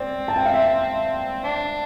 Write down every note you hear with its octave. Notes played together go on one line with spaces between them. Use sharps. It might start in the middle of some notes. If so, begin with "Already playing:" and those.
Already playing: C4 C5 D5
A5
G5
F5
E5
D4